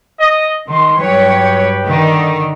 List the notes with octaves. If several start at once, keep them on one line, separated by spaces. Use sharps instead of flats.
D#5
D#3 C6
G2 F#3 G4 B4 C#5 G5
D3 D#3 D#4